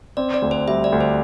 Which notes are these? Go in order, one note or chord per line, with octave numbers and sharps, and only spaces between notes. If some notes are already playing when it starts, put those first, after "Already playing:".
C4 D5
D5
D2
C5
G3 E5
D5
D2
C5